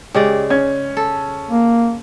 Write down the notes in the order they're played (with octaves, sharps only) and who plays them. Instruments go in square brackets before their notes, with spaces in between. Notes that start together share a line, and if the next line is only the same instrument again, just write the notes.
[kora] C#3 G#3 D5 [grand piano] G4
[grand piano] C#4 G#6
[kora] A4
[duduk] A#3